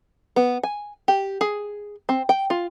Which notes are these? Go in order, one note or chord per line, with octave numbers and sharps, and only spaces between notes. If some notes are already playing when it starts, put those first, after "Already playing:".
B3
G#5
G4
G#4
C4
G5
F4